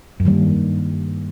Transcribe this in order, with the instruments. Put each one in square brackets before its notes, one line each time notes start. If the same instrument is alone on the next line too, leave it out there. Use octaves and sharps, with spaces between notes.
[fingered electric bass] F#2
[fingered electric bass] G2 [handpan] D#3 G3 A#3